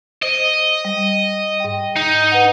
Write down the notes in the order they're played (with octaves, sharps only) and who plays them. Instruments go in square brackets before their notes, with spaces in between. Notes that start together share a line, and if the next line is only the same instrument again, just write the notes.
[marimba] C5 [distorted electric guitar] D#5
[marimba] G3
G#2 G5
[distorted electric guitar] D#4
[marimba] B4 F#5